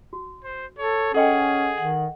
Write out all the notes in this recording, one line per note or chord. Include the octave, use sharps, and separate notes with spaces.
F#4
C5
A4 C#5
C#4 G#4 A4 D#5 F#5 G5
D#3 F#5